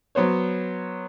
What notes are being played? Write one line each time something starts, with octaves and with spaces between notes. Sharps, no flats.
F#3 B3 C5 C#5